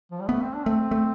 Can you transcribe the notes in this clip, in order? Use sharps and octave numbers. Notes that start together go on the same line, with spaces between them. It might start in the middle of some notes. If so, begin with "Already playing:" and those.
F3
G3
A3 B3
C4
D4
A3 C4
A3